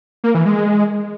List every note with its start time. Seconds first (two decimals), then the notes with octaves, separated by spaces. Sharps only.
0.24 A#3
0.35 E3
0.45 G#3